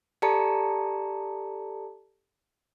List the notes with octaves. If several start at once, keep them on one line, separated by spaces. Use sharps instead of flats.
G4 A4 D5 A5 A#5 C#7